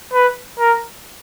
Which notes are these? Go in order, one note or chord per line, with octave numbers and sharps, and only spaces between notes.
B4
A#4